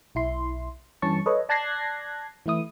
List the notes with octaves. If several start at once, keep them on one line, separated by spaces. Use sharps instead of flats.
B1 E4 C6
G2 E3 C#4 A5 C#6
A4 B4 C#5 D#5
D5 A5 F#6 G#6 A#6 C7
E3 A3 E4 D#6